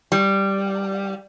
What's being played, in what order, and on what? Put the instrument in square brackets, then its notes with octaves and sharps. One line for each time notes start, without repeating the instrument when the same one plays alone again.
[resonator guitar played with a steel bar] G3